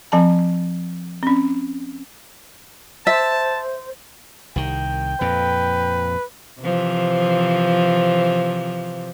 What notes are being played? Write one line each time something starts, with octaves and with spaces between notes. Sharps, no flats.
F3 C4 G#5 A5
C4 C#4
C5 E5 A5
C2 D#3 G5
F2 A#2 B4
C3 E3 F3